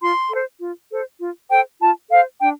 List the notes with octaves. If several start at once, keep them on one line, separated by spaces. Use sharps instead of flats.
F4 C6
A4
C5
F4
A4 C5
F4
A4 C5 G5
F4 A5
A4 C5 F5
D4 G5